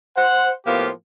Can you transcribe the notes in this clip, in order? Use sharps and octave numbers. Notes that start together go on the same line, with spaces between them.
C5 F#5
A2 F3 A#3 B3 F4 G4